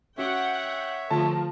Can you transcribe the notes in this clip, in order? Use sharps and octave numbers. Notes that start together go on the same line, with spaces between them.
C#4 F#4 C#5 E5 F#5 G5
D3 F3 A3 F4 A#4 A5